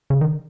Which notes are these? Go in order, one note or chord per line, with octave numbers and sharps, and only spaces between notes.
C#3
D#3